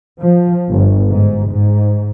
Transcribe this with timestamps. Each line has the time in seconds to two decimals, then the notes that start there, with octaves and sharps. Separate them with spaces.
0.19 F3
0.69 G1
1.08 G#2
1.51 G#2